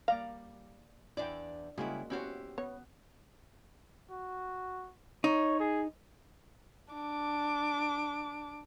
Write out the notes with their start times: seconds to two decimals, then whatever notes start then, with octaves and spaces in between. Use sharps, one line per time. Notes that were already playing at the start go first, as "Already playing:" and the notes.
0.08 G3 A#3 D5 F5 A#5
1.17 E2 D4 E4 D5 G5
1.78 C#3 G3 G#3 A#3 E4 F#4
2.10 B3 C#4 E4 F#4 G4 C5
2.58 B3 C#5
4.11 F#4
5.24 D#4 C#5
5.60 G#4
6.94 D4 D6